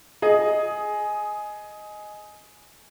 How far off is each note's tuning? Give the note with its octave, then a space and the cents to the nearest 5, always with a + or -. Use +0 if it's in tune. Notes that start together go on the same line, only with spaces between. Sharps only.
G#4 +10 D#5 +0